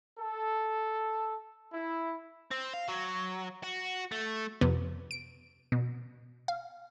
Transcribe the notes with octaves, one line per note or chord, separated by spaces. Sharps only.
A4
E4
C4
F5
F#3
F#4
A3
F2 C3 B3
D7
B2
F5